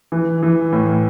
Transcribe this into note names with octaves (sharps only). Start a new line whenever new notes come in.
E3
E3
A2